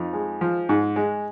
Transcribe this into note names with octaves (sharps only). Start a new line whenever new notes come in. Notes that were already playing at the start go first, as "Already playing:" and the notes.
Already playing: F2 D#4
G#3
F3
G#2
G#3